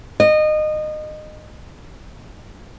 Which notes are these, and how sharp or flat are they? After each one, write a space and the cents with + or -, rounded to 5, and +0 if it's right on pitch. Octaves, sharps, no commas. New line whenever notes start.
D#5 -25